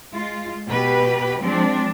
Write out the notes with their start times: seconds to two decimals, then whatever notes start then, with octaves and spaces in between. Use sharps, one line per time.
0.13 G#3 F4
0.68 B2 G4 B4
1.41 F3 G#3 C4 D4